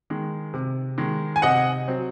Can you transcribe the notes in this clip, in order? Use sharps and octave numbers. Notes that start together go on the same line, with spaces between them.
D#3 G#3
C3
D#3 G#3
G#5
C3 D#5 F#5
F#3 C4